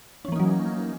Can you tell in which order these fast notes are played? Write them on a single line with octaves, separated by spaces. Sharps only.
C#4 E3 A#3 D#4 F#3